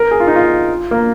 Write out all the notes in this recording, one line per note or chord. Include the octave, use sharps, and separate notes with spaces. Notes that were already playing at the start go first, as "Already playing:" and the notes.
Already playing: A#4
G#4
F4
D#4
F4
A#3